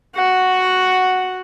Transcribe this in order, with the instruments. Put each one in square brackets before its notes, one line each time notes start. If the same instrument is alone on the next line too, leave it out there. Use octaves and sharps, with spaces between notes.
[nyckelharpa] F#4 F#5